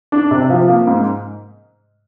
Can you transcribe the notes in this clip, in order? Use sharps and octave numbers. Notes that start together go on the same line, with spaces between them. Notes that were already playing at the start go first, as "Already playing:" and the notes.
D4
C3
F3
A#3
G#2